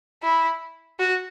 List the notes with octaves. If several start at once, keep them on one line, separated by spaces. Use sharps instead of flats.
E4
F#4